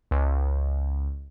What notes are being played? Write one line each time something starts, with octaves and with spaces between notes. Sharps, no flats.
C#2